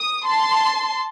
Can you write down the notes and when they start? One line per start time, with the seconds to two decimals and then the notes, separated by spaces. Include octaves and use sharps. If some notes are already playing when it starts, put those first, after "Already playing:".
Already playing: D#6
0.25 A5 C6